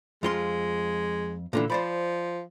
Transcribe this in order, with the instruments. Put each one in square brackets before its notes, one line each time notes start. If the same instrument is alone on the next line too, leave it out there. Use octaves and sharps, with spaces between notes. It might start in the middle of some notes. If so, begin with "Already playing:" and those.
[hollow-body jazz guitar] F2 F4 C6 [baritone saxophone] G#3
[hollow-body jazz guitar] A#2 D3 E3
[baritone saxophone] F3 [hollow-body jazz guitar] C5 D5 B5